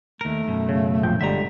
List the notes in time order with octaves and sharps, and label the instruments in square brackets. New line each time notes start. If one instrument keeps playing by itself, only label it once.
[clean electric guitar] D#2 A#4 [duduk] A3
[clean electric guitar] F#2 B2
[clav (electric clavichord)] C#3
A#1 F3 G5
[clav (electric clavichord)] G1 D3 G3 [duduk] G#3 [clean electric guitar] E5 A#5